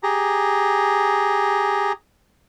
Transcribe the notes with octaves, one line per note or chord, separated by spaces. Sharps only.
G4 G#4 A#5